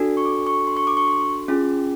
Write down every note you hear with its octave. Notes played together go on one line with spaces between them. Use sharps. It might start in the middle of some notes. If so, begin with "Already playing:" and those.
Already playing: D4 F#4 A4
C#6
D6
C#6
C6
C#6
D6
C#6
C6
C#4 F4 G#4